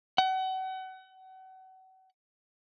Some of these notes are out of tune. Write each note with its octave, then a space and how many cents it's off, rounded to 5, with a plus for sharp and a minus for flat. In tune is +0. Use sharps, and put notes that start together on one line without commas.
F#5 +35